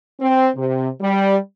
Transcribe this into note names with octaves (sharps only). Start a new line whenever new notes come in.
C4
C3
G3